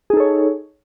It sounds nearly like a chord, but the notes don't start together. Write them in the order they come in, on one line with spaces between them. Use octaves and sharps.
G#4 D#4 A4 C#5